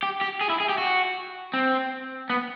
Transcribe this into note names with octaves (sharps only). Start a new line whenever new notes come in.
G4
G4
G#4
E4
G#4
G4
F#4
C4
B3